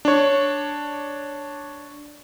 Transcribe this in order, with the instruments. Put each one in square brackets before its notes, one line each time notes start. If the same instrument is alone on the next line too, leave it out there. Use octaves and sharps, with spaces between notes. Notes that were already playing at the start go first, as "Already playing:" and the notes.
[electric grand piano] D4 C#5